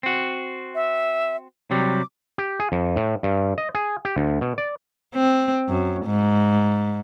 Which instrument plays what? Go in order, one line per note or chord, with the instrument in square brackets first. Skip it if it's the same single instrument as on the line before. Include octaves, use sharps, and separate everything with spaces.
[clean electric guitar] C4 F#4
[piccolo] E5
[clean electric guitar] C3 F#3 G3 [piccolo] D6
[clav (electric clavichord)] G4
G#4
F2
A2
G2
D#5
G#4
G4
D2
B2
D5
[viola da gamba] C4
F#2
G#2